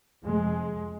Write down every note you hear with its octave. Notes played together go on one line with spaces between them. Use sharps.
F2 C3 G#3